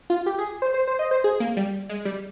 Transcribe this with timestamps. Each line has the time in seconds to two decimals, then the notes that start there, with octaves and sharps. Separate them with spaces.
0.10 F4
0.26 G4
0.38 G#4
0.62 C5
0.74 C5
0.88 C5
0.99 D#5
1.11 C5
1.24 G#4
1.40 A#3
1.57 G3
1.89 G#3
2.05 G3